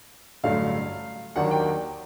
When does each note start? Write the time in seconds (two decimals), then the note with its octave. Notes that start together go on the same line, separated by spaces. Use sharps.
0.43 A1 G2 D3 F#3 A3 F5
1.36 D#2 D#3 F#3 A#3 D4 F#5
1.51 G5